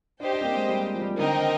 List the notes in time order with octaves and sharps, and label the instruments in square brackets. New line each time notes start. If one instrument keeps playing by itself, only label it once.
[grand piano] D4 [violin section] G4 C5 D#5 G5
[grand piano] D4
C4
A#3
G#3
G3
F3
G3
F3
[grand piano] D3 [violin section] C4 D#4 A#4 D#5 G5
[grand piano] D#3